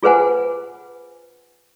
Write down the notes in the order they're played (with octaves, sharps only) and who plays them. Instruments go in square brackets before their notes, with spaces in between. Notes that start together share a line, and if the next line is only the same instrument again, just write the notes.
[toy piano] F4 G#4 B4 C5 F#5 G#5